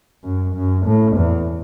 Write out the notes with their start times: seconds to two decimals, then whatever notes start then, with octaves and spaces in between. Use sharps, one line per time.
0.24 F#2
0.55 F#2
0.86 A2
1.17 E2